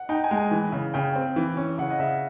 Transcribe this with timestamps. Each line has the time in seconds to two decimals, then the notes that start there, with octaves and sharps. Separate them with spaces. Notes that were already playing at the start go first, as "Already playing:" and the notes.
Already playing: F#5
0.09 D#4 G5
0.24 G#5
0.31 G#3
0.37 G#5
0.51 E3
0.72 C#3
0.94 C#3 G5
1.16 C4
1.36 E3
1.57 C#4
1.78 C#3 F#5
1.90 D#5
1.99 C#3 E5